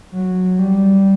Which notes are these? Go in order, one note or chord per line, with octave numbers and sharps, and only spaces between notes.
F#3
G3